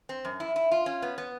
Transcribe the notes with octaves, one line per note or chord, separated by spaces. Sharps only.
C4
F#2
E4
E4
F4
C#4
B3
B3